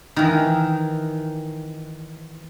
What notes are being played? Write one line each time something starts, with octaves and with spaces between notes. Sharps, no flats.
D#3 E3